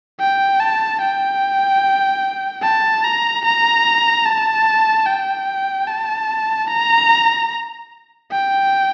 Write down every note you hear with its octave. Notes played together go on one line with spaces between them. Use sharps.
G5
A5
G5
A5
A#5
A#5
A5
G5
A5
A#5
G5